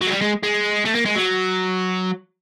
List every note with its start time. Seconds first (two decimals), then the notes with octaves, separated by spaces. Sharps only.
0.01 F#3
0.07 G#3
0.11 G3
0.21 G#3
0.43 G#3
0.85 A3
0.95 A#3
1.06 G#3
1.16 F#3